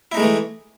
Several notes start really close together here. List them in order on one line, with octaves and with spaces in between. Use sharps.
E4 D#4 G#3 A3 E3